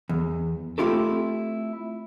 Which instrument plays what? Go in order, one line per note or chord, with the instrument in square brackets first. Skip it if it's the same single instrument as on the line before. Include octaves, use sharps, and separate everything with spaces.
[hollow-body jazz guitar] E2
A3 C4 E4 F4 G4 A4